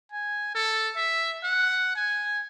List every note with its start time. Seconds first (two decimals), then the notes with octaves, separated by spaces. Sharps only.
0.12 G#5
0.55 A4
0.96 E5
1.44 F#5
1.96 G#5